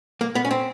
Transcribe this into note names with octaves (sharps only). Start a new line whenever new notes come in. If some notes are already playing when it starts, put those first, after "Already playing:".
A#3
B3
C#4
C4